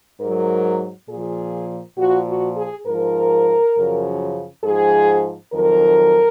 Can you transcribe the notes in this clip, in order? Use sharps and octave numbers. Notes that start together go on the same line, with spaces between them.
G#2 F#3 A#4
A#2 F3 G#4
A#2 F3 F#4
F#4
G#4
G#2 F3 A#4
F#2 C#3 F3
G#2 F3 G#4
F2 D#3 F#3 A#4